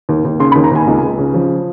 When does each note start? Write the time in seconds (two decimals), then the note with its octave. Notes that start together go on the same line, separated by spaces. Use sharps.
0.09 D#2
0.25 D#2
0.39 C#3 C6
0.52 B5
0.55 D#2
0.64 A#5
0.71 D#2 G#5
0.87 C#2
1.03 C#2
1.18 C#3
1.34 F3